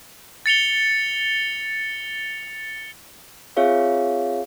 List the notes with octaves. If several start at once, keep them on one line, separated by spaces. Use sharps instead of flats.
A6 C#7 F7 G7
C4 F4 G#4 C#5 E5 F5